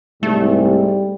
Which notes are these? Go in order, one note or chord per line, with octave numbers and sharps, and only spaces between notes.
C2 G#2 G3 A3